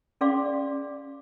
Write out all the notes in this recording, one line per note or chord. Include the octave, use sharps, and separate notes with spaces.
C#4 G#4 D5 F5 C6 D6